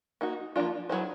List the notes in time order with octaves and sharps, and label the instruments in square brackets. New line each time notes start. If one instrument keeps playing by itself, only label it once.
[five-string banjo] A#3 D#4 F#4
F3 A#3 D4 F4
F#3 B3 E4 G#4 C5